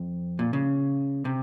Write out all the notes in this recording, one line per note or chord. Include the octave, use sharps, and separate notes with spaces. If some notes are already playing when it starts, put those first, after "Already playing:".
Already playing: F2
A#2
C#3
C3